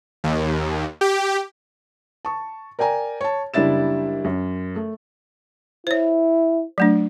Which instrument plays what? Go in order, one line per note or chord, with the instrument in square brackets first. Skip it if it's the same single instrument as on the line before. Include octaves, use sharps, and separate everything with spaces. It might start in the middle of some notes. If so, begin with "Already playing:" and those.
[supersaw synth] D#2
G4
[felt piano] A5 C#6
A#4 D5 G5 G#5 A#5
C#5 A5
F#1 G3 D4 E4 A6 E7
F#2
A3
[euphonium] E4 [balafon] C5 C#5
[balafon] F#3 A3 D4